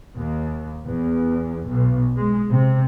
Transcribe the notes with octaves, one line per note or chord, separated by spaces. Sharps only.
D#2
E2
B1
G#3
C3